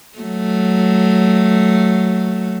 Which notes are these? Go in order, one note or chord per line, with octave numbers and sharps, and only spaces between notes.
F#3 A3